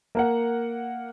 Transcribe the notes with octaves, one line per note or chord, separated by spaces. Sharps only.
A#3 A#4 F#5